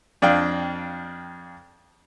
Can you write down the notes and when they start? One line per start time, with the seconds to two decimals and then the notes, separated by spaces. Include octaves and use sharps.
0.22 F2 D4 F5 G5